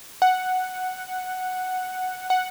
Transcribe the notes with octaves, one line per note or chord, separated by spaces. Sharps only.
F#5
F#5